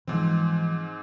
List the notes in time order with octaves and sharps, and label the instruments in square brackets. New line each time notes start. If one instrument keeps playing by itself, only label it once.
[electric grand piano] G#2 C4 [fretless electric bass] E3 F3